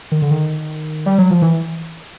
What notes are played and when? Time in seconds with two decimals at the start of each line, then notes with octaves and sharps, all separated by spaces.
0.12 D#3
0.22 D3
0.31 D#3
1.06 G3
1.18 F#3
1.31 F3
1.42 E3